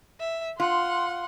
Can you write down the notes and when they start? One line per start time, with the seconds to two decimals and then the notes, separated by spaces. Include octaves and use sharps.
0.20 E5
0.60 F4 F#5 C6